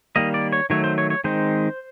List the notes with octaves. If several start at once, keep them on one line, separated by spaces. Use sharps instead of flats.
D#3 G3 A#3 D#5
D5
C#5
D#3 F#3 A3 C#5
C5
C#5
C#5
D#3 G#3 C4 D#4 C5